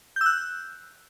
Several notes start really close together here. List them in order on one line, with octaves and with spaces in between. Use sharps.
G6 E6 F#6